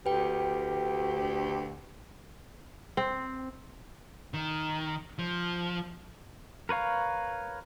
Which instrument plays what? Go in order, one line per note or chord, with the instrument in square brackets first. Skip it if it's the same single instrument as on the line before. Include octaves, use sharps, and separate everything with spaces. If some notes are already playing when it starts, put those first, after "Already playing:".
[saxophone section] D2 G4 [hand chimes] B4 G5
[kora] C4
[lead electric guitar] D#3
F3
[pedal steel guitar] A#4 B4 C#5 F5 A#5